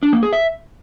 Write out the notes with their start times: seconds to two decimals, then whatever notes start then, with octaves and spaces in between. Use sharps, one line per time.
0.03 D4
0.13 A#3
0.23 G#4
0.33 E5